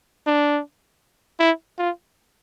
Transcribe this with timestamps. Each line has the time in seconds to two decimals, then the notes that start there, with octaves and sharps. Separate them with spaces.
0.27 D4
1.39 E4
1.78 F4